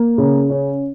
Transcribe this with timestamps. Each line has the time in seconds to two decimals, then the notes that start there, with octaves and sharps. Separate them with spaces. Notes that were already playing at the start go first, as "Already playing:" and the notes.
Already playing: A#3
0.18 C#3
0.50 C#4